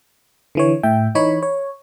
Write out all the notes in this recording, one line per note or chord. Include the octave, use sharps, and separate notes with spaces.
D3 E3 C#5
A2 E5 G5
E3 D#4 C#5 B5
C#5